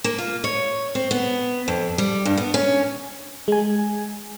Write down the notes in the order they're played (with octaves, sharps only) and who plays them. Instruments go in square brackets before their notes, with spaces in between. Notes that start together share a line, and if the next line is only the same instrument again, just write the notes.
[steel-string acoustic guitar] A#3
F4
C#5
C4
B3
F2
G3
G2
B3
C#4
[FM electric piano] G#3 G#5